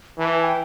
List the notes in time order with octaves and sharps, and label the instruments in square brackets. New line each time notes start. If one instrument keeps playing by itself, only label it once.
[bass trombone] E3 [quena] A5
[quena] G#5
G5